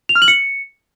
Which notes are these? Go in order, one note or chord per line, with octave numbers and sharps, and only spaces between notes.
F7
F6
F#7
C#7